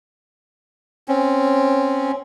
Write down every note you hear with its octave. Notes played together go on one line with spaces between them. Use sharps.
C4 C#4